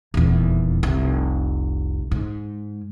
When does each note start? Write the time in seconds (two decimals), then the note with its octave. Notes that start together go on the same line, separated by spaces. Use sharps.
0.14 D#1 E2
0.83 F1 C2
2.11 G#2